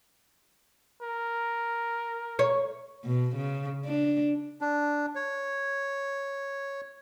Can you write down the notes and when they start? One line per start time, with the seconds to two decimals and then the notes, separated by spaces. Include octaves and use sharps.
1.02 A#4
2.39 C#5
3.04 B2
3.36 C#3
3.85 D4
4.61 D4
5.15 C#5